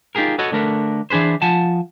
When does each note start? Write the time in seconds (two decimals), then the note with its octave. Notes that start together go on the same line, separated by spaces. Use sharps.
0.15 D#4 F4 G4 G#4 A#4
0.38 F#4 A4 B4 C#5 D#5
0.52 D3 A3 A#4 B4
1.10 E3 D4 G#4 B4 C5
1.42 F3 F#5 G#5 A5